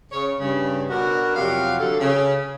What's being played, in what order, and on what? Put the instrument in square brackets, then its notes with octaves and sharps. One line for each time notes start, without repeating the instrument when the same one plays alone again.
[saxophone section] C#3 C#5
G2 C#3
B2 D4 F#4 A#4
F2 C3 F#3 F5
D3 F#3 A4
C#3